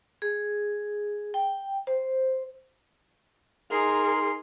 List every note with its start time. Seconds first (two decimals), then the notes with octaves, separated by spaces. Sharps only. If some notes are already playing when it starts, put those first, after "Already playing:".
0.22 G#4
1.34 G5
1.87 C5
3.71 D#4 G#4 A#4 C6